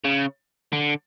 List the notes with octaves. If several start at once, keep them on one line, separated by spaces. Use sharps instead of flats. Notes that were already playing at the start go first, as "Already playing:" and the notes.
C#3
D3